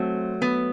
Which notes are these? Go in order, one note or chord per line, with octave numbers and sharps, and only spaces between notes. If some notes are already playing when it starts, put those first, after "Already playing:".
Already playing: F#3 A3 C4
B3